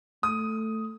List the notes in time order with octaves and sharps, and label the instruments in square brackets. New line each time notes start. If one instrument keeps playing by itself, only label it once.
[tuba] A3 [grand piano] D#6